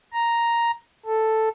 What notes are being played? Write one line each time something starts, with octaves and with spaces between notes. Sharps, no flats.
A#5
A4